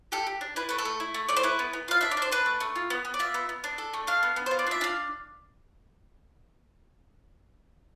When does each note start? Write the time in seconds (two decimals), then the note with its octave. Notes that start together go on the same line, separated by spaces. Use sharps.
0.12 G4 A4
0.27 G4
0.41 D4
0.56 E4 B4
0.69 A3 B4
0.78 A4
0.85 A3
1.00 E4
1.14 A3
1.29 A3 D5
1.36 C5
1.43 E4 B4
1.59 B3
1.73 B3
1.88 F4 F5
2.01 D4 E5
2.11 D5
2.17 D4 C5
2.32 D4 B4
2.46 A3
2.60 A3
2.76 F4
2.90 B3
3.05 B3
3.14 D5
3.19 F4 E5
3.34 B3
3.49 B3
3.64 D4
3.78 A4
3.94 A3
4.07 D4 F5
4.23 B3
4.36 B3
4.46 F4 C5
4.59 D5
4.66 D4 E5
4.81 D4 F5